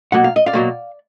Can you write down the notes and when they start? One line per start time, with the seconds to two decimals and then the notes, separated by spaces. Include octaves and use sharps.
0.12 B2 F#3 A#3 F#5
0.24 F5
0.36 D#5
0.46 D5 F5
0.53 B2 F#3 A#3